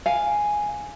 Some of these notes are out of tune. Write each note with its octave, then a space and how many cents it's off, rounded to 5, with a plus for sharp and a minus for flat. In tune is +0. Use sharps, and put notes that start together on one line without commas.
F5 +0 G#5 +0